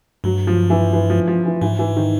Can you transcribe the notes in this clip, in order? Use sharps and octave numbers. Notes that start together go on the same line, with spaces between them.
G2 F#3
F3
E3
E3
F3
F3
E3
G#2 E3
E3
D#3